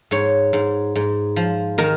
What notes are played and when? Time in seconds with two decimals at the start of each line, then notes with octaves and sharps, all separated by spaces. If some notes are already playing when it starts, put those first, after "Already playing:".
0.11 G#2 C#5
0.53 G#2
0.95 G#2
1.36 F3
1.78 D#3 A#4